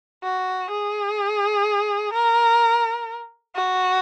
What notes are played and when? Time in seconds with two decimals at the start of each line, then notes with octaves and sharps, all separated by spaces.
0.23 F#4
0.70 G#4
2.13 A#4
3.56 F#4